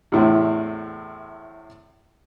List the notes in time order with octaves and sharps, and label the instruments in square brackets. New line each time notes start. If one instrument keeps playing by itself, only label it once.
[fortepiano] E2 A2 C3